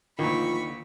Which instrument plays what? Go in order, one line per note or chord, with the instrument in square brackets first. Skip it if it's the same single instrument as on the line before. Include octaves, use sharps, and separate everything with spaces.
[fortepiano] D2 A#2 [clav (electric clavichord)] D#3 [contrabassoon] F3 [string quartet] A#3 B5 C#6